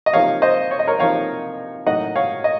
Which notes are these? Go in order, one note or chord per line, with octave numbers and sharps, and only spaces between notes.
D#5
C3 F3 A#3 D#4 C#5 F5
C5 D#5
C#5
D#5
A#4 C#5
C3 F3 A#3 D#4 C#5 F5
A2 F#3 A#3 D#4 D#5 F#5
C#5 F5
D#5